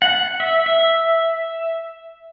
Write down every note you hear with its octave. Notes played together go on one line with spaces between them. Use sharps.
F#5
E5
E5